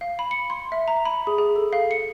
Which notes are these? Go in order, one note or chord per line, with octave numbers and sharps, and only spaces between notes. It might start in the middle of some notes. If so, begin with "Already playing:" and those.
F5
B5
C#7
C6
E5
A#5
B5
G#4
G#4
A4
F5
C#7